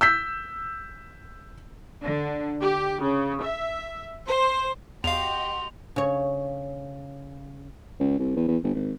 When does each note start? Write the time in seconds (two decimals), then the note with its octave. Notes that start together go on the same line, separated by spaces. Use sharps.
0.01 E6 G6 B6
2.02 D3
2.62 G4
3.02 C#3
3.43 E5
4.26 C5
5.04 E2 F#4 G4 D#5 F5 C6 F7
5.96 C#3 C#5
8.00 C#2
8.19 C2
8.36 E2
8.48 E2
8.63 G1
8.75 G#1